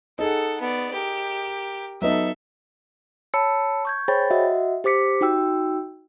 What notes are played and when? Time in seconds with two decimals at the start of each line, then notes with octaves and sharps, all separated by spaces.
0.19 D#4 G#4 A4 F#5
0.61 B3 D5
0.93 G4 A#4
2.02 F#3 B3 D#4 A4 E5
3.34 C#5 A5 B5 E6 C#7
3.85 C#6 G6 G#6
4.08 G#4 C5 C#5 G5 B5 A6
4.31 F#4 D#5 E5 F#5
4.84 G4 C5 D6 B6 C#7
5.21 D#4 F#4 G5 E6